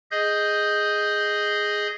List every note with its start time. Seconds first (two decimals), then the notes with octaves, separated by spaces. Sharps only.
0.11 G#4 D#5 G6